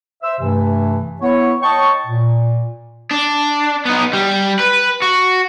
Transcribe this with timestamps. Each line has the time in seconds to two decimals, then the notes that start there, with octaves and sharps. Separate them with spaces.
0.22 C5 E5 E6
0.40 G2 C3 E3 A3
1.21 B3 E4 C#5
1.62 C#5 D#5 G5 A5 C#6
2.06 A#2
3.11 D4
3.86 B3 D#4
4.13 G3
4.59 B4
5.02 F#4